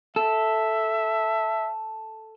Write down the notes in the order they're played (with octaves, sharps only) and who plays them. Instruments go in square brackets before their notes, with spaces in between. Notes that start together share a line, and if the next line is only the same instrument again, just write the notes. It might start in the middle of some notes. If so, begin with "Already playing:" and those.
[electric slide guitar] A4 [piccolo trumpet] E5